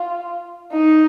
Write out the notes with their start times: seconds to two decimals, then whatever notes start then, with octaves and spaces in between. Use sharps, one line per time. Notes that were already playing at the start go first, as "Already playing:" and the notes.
Already playing: F4
0.72 D#4